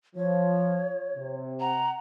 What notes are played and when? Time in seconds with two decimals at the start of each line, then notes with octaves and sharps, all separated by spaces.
0.16 F3 C#5
1.16 C3
1.60 F#5 A#5